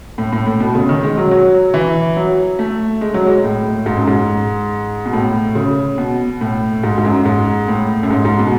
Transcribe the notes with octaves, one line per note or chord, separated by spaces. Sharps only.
A2
A2
A2
B2
C#3
D#3
G#3
F#3
F#3
E3
F#3
A3
G#3
F#3
G#3
A2
G#2
F#2
G#2
B2
A2
C#3
B2
A2
G#2
G#2
F#2
G#2
A2
F#2
G#2
G#2
B2